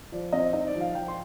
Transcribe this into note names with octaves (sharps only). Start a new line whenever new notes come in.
F3 D5
C4 D#5
D#4 D#5
D5
F3
F5
F3 G5
C6